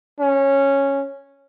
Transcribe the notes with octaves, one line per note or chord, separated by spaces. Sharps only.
C#4